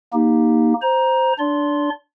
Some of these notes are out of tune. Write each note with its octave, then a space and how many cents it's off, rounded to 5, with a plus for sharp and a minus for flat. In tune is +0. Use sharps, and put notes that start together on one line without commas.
A#3 +15 D#4 +0 G4 +0
C5 +0 A#5 +15
D4 +0 D5 -35 C6 +0